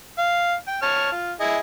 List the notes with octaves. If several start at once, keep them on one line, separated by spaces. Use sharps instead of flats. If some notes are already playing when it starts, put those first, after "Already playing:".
F5
G5
C#5 A5 F6
F4
E4 G#4 D#5